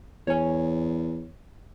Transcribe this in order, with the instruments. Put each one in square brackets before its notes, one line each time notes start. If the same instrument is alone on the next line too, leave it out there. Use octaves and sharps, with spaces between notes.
[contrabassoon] E2 [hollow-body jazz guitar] C#5 G#5